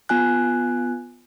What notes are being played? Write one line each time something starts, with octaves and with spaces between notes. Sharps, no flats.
B3 F4 G#5 F#6